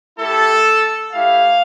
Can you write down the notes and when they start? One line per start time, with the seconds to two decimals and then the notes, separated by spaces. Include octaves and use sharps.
0.18 A3 E4 G4 A4
1.12 A3 E4 G4 F5